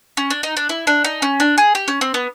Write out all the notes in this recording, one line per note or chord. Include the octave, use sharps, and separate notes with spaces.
C#4
D4
D#4
D4
E4
D4
D#4
C#4
D4
G#4
G4
C#4
C4
B3